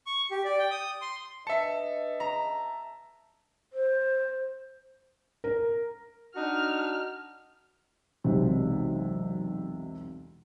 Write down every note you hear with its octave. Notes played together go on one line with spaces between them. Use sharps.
C#6
G4
D5
G5
D#6
C6
D4 B4 D#5 E5 A5 C#7
A#5
C5
A#4
D4 D#4 F#4 F6
E1 B1 C3